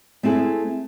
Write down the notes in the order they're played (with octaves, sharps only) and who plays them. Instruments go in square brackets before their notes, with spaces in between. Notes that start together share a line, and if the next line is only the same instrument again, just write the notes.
[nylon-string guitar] A3 C4 E4 G#4